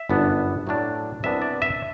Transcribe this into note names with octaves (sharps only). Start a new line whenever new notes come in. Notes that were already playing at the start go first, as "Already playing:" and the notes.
Already playing: E5
G1 F#2 E3 B3 D4
A2 F#3 A3 D4
C2 C3 E3 B3 D4 E5
D5
E5